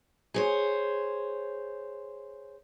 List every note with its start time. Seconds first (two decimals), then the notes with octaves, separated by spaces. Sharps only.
0.34 G#4 C5 C#5